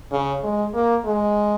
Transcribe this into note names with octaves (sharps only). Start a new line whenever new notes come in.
C#3
G#3
A#3
G#3